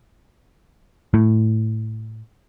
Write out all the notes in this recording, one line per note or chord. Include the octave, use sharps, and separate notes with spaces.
A2